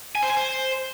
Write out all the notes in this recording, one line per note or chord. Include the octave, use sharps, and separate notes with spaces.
G#5
C5
G#5
C5